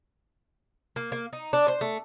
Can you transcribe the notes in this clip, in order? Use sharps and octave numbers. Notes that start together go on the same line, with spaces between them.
A#3
A#3
D#4
D4
C5
A3